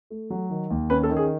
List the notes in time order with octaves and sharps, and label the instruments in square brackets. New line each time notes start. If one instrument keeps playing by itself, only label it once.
[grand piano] A3
F#3
D#3
D#2
C#4 B4
A4
D#3
G#4